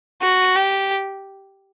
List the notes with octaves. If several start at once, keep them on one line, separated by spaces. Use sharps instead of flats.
F#4
G4